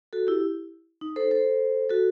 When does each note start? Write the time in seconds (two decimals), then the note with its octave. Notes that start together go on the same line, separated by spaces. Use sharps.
0.13 F#4 A4
0.27 E4 G4
1.01 D#4
1.16 A4 C5
1.31 A4 C5
1.89 F#4 A4